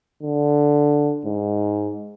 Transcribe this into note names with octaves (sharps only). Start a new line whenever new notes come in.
D3
G#2